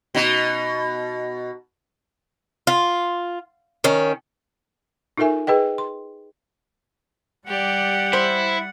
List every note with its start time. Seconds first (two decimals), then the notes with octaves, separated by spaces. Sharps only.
0.15 B2 D#4
2.67 F4
3.84 D#3 C#4
5.18 D#4 F4 A4 A#4 E5 G#5
5.47 G#4 B4 D#5 G5
5.78 C6
7.47 G3 G4 D5 F#5
8.13 E4 C5